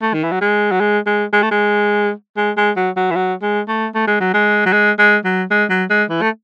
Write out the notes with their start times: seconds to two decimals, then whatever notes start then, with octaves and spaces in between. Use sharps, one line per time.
0.02 A3
0.13 D#3
0.23 E3
0.31 F#3
0.41 G#3
0.71 F#3
0.80 G#3
1.06 G#3
1.33 G#3
1.43 A3
1.51 G#3
2.37 G#3
2.57 G#3
2.76 F#3
2.96 F#3
3.11 E3
3.16 F#3
3.42 G#3
3.68 A3
3.95 A3
4.07 G#3
4.20 F#3
4.34 G#3
4.66 F#3
4.73 G#3
4.99 G#3
5.25 F#3
5.51 G#3
5.70 F#3
5.90 G#3
6.10 E3
6.21 A3